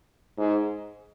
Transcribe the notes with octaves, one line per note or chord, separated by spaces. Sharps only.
G#2